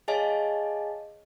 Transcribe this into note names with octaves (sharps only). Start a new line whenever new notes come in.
G#4 C#5 D#5 F5 G#5 A5